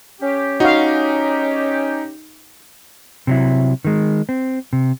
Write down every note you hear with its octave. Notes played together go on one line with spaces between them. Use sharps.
C#4 G4
D#4 F#4 F5
C3 F#3 E4
D#3 G#3
C4
C3